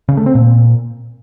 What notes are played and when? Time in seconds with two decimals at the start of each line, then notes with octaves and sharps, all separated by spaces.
0.09 C#3
0.17 A3
0.26 C4
0.35 A#2